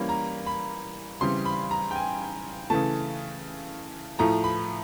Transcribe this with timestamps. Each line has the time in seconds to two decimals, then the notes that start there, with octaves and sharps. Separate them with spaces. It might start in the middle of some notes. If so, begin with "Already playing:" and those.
Already playing: E3 G3 A#3 C#4 B5
0.09 A#5
0.46 B5
1.21 C#3 E3 G3 C4 C6
1.45 B5
1.71 A#5
1.91 G5
1.96 G#5
2.70 C#3 E3 A3 A5
4.19 A2 F3 A3 A#5
4.44 B5